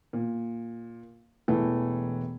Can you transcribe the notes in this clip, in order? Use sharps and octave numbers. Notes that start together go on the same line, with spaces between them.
A#2
E1 E3 A3